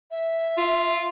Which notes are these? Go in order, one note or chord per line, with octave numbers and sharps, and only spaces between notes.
E5
F4